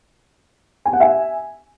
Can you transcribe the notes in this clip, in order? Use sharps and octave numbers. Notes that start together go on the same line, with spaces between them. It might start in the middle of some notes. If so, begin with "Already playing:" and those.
G#5
F#5
E5 G#5